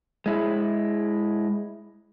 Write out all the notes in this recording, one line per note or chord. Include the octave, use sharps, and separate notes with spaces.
G#3 E4